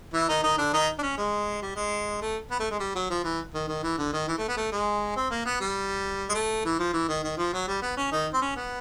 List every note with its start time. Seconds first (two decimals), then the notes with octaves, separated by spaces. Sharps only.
0.14 E3 E4
0.28 D#3 D#4
0.43 D#3 D#4
0.58 D3 D4
0.73 D#3 D#4
0.99 D4
1.03 C#4
1.18 G#3
1.62 G3
1.76 G#3
2.21 A3
2.51 B3
2.60 A3
2.71 G#3
2.80 G3
2.95 F#3
3.10 F3
3.24 E3
3.54 D#3
3.68 D#3
3.83 E3
3.98 D3
4.13 D#3
4.28 E3
4.38 A3
4.48 B3
4.57 A3
4.72 G#3
5.16 C4
5.31 A#3
5.46 B3
5.61 G3
6.29 G#3
6.35 A3
6.65 E3
6.79 F3
6.94 E3
7.08 D#3
7.24 D#3
7.38 F3
7.53 F#3
7.68 G3
7.82 B3
7.97 C#4
8.12 D#3 D#4
8.34 C4
8.42 C#4
8.56 B3